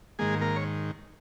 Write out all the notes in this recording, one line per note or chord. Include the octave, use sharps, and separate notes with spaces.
G#2 D#3 G#3 A#3 G#4
A#3 A#4
C#5